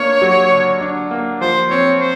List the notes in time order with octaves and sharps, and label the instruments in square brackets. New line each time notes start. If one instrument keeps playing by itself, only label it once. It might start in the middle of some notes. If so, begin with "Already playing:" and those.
Already playing: [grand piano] A#3 D4 [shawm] C#5
[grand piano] F#3
D3
D4
A#3
[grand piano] F3 [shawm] C5
[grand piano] C4 [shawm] C#5
[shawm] C5